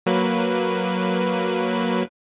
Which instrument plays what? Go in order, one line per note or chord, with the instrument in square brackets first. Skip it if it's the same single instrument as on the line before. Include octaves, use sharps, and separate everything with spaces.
[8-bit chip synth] F#3 A#3 B4